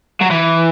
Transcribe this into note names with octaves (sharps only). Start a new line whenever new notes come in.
F#3
E3